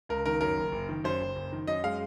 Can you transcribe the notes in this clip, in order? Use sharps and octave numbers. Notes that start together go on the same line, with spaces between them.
C#2 A#4
D#3 A#4
F#2 A#4
F#1
F#1
D#3
F#2 C5
F#1
F#1
D#3
F#2 D#5
G#3 F5